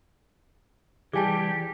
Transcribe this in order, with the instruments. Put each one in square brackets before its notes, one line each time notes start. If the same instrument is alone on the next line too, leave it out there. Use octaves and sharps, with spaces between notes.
[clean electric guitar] E3 G3 [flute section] G4 [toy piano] G#4 G#5 A5